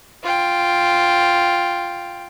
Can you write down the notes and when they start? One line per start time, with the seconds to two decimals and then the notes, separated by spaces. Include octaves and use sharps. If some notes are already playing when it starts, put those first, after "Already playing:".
0.24 F4 G5